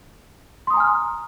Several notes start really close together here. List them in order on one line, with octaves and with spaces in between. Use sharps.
C6 D#6 A#5 G#5 F6